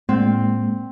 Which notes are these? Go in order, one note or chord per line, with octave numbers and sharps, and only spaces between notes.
A2 G#3 A#3 C4